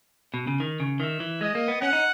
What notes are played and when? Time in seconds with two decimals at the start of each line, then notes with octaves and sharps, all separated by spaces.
0.34 B2
0.47 C#3
0.60 D#3
0.80 C#3
1.00 D#3 E5
1.20 E3
1.41 G#3 D#5
1.55 A#3
1.68 B3
1.81 C#4 F#5
1.93 D#4